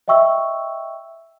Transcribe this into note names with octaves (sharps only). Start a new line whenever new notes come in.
D#5 E5 G5 C#6 E6